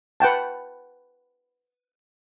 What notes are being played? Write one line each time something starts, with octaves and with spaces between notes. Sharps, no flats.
B4 F#5 G5 A5